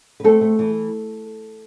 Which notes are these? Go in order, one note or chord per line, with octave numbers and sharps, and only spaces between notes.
B4
A3 C4 A4
A3
E3